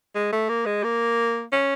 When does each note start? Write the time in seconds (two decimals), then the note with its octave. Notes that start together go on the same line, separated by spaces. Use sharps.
0.15 G#3
0.32 A3
0.49 A#3
0.66 G#3
0.84 A#3
1.52 C#4